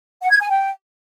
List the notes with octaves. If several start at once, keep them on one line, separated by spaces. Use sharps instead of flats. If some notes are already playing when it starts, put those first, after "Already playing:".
F#5
G#6
G#5
G5